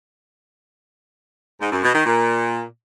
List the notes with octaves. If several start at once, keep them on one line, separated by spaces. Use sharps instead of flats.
G#2
F#2
B2
D#3
A#2